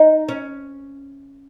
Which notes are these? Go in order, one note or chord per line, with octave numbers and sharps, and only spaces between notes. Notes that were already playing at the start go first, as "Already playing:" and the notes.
Already playing: D#4
C#4